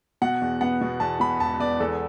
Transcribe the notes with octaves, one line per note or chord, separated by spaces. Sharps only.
B2 F#5
E2
B3 F#5
B2
E2 A5
B2 B5
E1 A5
B3 D5
E2 A4